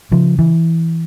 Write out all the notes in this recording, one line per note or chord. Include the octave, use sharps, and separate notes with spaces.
C#3 F3
E3